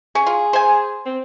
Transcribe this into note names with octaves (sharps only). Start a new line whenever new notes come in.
C#4 G#4
F4
C5 G#5
C4